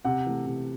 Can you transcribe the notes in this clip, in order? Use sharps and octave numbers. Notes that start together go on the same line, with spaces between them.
C3 F#5
E3 A3
C3